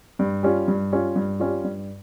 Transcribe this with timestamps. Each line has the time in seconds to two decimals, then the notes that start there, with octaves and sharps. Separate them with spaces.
0.19 G2
0.43 G3 C#4 F4
0.68 G2
0.92 G3 C#4 F4
1.16 G2
1.40 G3 C#4 F4
1.64 G2